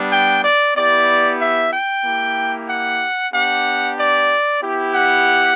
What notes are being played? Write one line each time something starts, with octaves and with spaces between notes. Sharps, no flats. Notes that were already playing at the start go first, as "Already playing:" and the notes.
Already playing: G3 B3 D4
G5
D5
B3 E4 G4 D5
E5
G5
A#3 E4 G4
F#5
B3 D4 G4 F#5
D5
B3 E4 G4
F#5